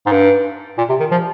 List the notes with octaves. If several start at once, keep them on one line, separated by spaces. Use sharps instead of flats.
G#2
G2
A#2
C3
D#3
F3